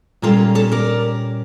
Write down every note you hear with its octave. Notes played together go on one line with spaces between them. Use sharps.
A#2 G3 A#3 C#4 F4 A4
A4 C#5
A#4 D5